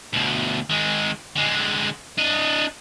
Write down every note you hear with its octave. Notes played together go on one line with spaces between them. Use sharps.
D2 B2
D#3 G#3
D3 G#3
D4 D#5